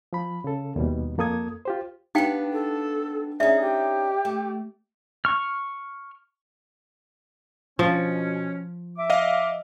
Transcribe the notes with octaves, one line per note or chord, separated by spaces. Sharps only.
F3 B5
C#3 A4
D#2 B2 G3
F2 A#3 A4 D#6 G#6
F4 G4 C5
B3 D4 D#4 G4 F5 G5
A4
C#4 D#4 G#4 D5 E5
G4
A3
C#6 F6
B2 F3 C#4
E5 D6
D#5 F5